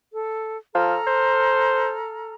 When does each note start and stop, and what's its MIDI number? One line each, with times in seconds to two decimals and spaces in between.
0.12 0.56 69
0.75 0.96 53
0.75 2.34 69
0.75 2.34 82
0.75 2.34 89
1.07 1.94 72